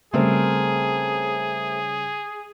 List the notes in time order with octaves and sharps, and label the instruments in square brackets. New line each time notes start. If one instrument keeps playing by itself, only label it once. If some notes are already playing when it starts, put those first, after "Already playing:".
[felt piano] C#3 G3 [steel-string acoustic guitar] A3 C4 A#4 [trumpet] G#4